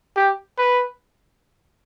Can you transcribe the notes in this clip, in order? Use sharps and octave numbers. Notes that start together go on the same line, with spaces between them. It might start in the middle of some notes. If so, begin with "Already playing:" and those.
G4
B4